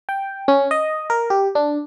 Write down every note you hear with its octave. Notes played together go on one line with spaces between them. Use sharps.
G5
C#4
D#5
A#4
G4
D4